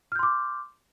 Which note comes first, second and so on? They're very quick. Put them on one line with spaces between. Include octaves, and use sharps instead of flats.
F6 G6 C6 D6